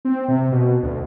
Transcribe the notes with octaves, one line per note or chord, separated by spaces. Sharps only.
C4
C3
B2
D2